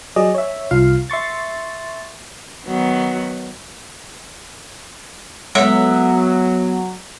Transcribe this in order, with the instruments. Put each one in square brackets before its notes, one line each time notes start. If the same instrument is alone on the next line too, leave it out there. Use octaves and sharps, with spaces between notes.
[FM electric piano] F#3 G#4 D5 D#5
C#5 E5
C2 F4 F5
E5 C6 C#6 A6
[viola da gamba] D#3 F#3 B3
[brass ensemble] F#3 [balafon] G#3 C#5 F#5 [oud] B3 A4 [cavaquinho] E5